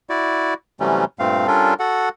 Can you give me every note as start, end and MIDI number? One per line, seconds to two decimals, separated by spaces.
0.10 0.54 64
0.10 0.54 66
0.10 0.54 74
0.80 1.05 48
0.80 1.05 52
0.80 1.05 54
0.80 1.05 55
0.80 1.05 57
0.80 1.05 61
1.19 1.47 43
1.19 1.47 46
1.19 1.47 57
1.19 1.47 60
1.19 1.47 77
1.47 1.74 55
1.47 1.74 61
1.47 1.74 62
1.47 1.74 65
1.47 1.74 69
1.47 1.74 70
1.80 2.09 66
1.80 2.09 69
1.80 2.09 78